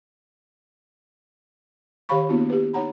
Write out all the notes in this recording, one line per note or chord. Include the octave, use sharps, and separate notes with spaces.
D#3 G4 C#5 F5 B5 C#6
A#3 B3 D4 E4 F#4
G4 B4
D#4 C#5 F#5 A#5 B5